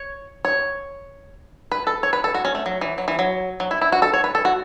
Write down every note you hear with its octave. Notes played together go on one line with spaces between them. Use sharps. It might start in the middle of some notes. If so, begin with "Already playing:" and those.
Already playing: C#5
C#5
B4
A4
C#5
B4
A4
F#4
C#4
A3
F#3
E3
F#3
E3
F#3
F#3
E4
E4
F#4
A4
C#5
B4
A4
F#4